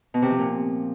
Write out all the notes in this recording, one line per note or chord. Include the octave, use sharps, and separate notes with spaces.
B2
C3
F3
A#2